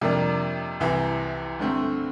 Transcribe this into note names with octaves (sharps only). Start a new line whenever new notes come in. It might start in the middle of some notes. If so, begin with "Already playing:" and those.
F2 C3 G3 A#3 D4
C2 C3 E3
G2 D3 A3 C4